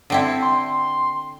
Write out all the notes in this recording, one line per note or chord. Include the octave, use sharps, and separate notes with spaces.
D3 C4 E4
C6